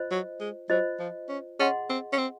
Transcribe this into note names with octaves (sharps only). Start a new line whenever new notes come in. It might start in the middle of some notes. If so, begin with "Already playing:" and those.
Already playing: F4 C5 D#5
F#3
G#3
F#3 F4 C5 D#5
F3
C#4
C#4 G#4 D#5 F#5 C6
C4
C#4
C4